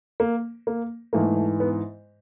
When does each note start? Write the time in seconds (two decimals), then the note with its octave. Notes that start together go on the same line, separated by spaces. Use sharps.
0.20 A#3
0.67 A#3
1.13 G#2 E3 A3 A#3
1.37 A3
1.60 B3